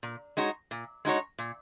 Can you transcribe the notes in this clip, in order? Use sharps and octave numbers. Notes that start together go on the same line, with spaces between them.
A#2
G#3 D#4 F#4 C#5
A#2
G#3 D#4 F#4 C#5
A#2